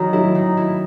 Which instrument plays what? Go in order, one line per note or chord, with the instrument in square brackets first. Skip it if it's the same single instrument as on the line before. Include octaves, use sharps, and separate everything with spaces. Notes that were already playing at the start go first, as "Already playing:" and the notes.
Already playing: [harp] D#3 [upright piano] F#3
[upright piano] F#3 [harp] E4
[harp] D#3
E4